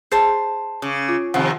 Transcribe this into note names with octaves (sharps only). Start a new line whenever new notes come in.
G#4 C5 A5
C#3 D6
F4
C3 D#3 F3 F4 F#5